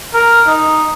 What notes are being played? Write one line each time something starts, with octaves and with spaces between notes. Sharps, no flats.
A#4
D#4